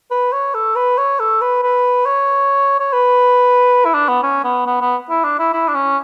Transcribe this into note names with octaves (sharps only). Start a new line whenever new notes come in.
B4
C#5
A4
B4
C#5
A4
B4
B4
C#5
C#5
B4
E4
D4
B3
C#4
B3
B3
B3
E4
D4
E4
E4
D4
C#4